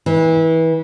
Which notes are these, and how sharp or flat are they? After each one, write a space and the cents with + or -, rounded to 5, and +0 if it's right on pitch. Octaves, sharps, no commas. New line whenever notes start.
E3 -25